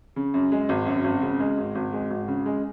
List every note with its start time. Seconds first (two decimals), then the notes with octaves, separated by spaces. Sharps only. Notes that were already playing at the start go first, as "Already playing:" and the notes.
0.16 C#3
0.34 F#2
0.52 G#3
0.69 G#1
0.87 F#2
1.04 G#1
1.22 C#3
1.40 G#3
1.58 G#1
1.75 G#1
1.93 G#3
2.11 G#1
2.28 C#3
2.46 G#3